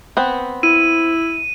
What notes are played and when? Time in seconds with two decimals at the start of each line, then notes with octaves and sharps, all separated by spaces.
0.17 B3 C4
0.63 E4 D#7